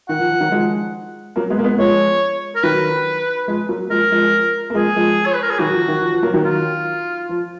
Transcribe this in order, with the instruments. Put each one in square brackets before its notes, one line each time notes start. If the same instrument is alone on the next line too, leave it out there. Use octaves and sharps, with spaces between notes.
[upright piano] D#3 [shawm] F#5
[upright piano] F3
F3
D#3 F#3
F3 G#3
F#3 A#3
G#3 B3
A#3
G#3 B3
[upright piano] F3 G#3 [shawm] C#5
[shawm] A#4
[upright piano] D#3 F#3 [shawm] B4
[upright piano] F3 G#3
F#3 A#3
[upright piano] F3 G#3 [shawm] A#4
[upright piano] F3 G#3
A#3
[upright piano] F3 G#3 [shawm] G#4
[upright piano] F3 G#3
[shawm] C#5
B4
A#4
G#4
[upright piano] D#3 F#3 [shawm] F#4
[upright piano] F3
D#3
F3
F3
F#3 A#3
D#3 F#3
[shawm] F4
[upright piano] F3